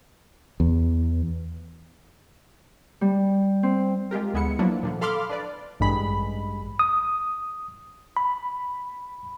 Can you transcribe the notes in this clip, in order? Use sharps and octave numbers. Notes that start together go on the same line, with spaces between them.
E2
G3
C4
G#3 F4 G4 A#4
D2 G#3 B3 E4 C#7
F3 F#3 A#3 B3 D4 E4
A#2 D3 F3
A4 F5 B5 C6 D6 F6
D4 B4 D5
A1 G2 G#3 B5
D#6
B5